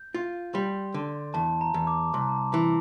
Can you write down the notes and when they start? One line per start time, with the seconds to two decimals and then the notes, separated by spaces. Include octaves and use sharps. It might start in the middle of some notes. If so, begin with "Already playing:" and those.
Already playing: G6
0.14 F4
0.54 G3 C6
0.94 D3
1.34 E2 A5
1.61 A#5
1.74 E2
1.87 D6
2.14 C2 C6
2.21 A#5
2.29 A5
2.37 A#5
2.54 E3 C6